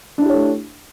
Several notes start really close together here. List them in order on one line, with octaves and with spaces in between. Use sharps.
D4 E4 G4 C#5 A3